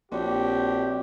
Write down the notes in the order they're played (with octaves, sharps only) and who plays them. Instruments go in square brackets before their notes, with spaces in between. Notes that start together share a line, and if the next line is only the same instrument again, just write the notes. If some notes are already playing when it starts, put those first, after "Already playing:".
[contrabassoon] A#1 [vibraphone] C4 F#4 C#5 [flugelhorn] G4